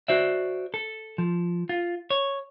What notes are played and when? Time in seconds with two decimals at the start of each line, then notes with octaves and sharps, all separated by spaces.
0.08 F#4 C5 D5 E5
0.74 A4
1.18 F3
1.69 F4
2.10 C#5